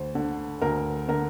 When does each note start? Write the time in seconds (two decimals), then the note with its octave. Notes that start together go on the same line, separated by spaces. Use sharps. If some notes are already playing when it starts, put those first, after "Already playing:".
Already playing: D2 C5
0.15 D3
0.62 D2 A#4
1.08 D3 A#4